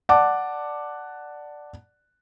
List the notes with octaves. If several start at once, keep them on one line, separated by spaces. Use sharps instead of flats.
D5 F#5 A5 D6